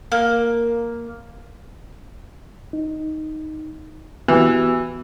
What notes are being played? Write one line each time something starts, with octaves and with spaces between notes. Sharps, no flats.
A#3
D#4
E3 B3 F#4 G4